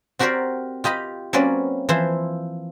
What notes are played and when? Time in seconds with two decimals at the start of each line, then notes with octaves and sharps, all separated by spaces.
0.19 C4 F#4 G4 A#4 C5 D5
0.84 F4 G4 D#5 B5
1.33 F#3 A#3 C4 C#4 B4 D5
1.89 E3 F3 E4 C5